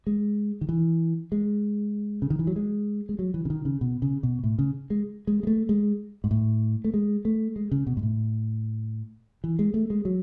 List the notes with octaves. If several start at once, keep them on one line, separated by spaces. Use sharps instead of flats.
G#3
D#3
E3
G#3
C#3
D#3
E3
F#3
G#3
G#3
F#3
E3
C#3
D#3
C#3
B2
C#3
B2
A2
C#3
G#3
G#3
G#3
A3
G#3
G#2
A2
A3
G#3
A3
G#3
C#3
B2
G#2
A2
E3
G#3
A3
G#3
F#3